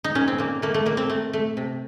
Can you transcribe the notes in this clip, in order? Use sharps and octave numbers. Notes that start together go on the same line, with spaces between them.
D#4
A#2 C#4
C4
A#2 A#3
A3 A#3
A3
A#2 A#3
C4
A3
A3
C3